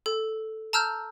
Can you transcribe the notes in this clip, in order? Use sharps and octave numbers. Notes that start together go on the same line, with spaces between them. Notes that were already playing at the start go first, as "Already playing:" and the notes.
A4
A5 A#5 E6 F6 G6